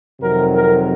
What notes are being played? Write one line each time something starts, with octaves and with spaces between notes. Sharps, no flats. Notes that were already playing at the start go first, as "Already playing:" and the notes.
F2 C3 D#3 F#3 A#4
A#4